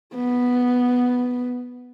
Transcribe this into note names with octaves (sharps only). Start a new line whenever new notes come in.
B3